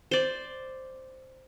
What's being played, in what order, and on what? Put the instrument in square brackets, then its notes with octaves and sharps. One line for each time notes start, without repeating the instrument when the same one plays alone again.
[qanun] C5 D5